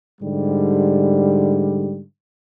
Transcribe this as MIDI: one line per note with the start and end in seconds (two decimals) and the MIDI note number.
0.20 2.02 44
0.20 2.02 50
0.20 2.02 55